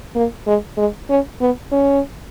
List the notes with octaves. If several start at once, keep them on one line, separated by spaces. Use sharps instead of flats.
A#3
G#3
G#3
C#4
B3
C#4